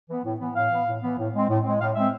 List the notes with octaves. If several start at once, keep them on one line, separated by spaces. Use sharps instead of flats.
E3 B3
A2
E3 B3
A2 F5
E3 B3
A2
E3 B3
A2
G#3 C4
A2
G#3 C4
A2 F5
G#3 C4 E5